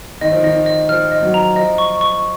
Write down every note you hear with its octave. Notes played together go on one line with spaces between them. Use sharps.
D#3 D#5
F3
D#3 D#5
D#5
F3 F6
D#5
F#3
A#5
F3 D#5
C#6
C#6